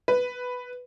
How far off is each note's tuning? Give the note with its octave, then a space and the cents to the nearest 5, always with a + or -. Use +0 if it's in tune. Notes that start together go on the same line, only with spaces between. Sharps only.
B4 +5